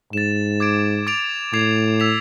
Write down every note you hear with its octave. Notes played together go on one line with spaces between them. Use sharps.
G#2 A6 E7
D6 G#6 D7
D6 A6 D7 F7
A2 D6 G#6 C7 F7
E6 G#6 B6 F7